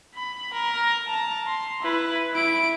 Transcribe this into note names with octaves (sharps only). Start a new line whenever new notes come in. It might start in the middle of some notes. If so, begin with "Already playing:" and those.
B5
A#4
A5 A#5
C6
E4 B4
E4 D7